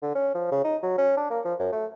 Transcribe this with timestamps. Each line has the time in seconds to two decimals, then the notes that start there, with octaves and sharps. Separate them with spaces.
0.03 D3
0.15 C#4
0.35 F3
0.52 C#3
0.64 D#4
0.82 F#3
0.98 C#4
1.17 D4
1.30 A#3
1.45 F3
1.59 F#2
1.72 A3